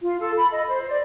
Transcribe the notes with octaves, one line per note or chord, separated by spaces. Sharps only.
F4
A4
B5
D#5
C5
D5